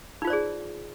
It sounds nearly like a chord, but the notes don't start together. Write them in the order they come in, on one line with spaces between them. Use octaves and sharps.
D#4 F4 C5 D5 G#4